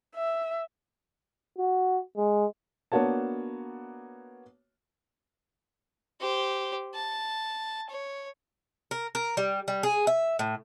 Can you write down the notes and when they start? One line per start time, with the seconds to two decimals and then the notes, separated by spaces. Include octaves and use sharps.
0.16 E5
1.59 F#4
2.17 G#3
2.92 A#3 B3 D4 F#4 C#5 A5
6.20 G4 C5
6.95 A5
7.90 C#5
8.91 A#4
9.15 A#4
9.37 G3
9.68 G3
9.83 G#4
10.07 E5
10.39 A2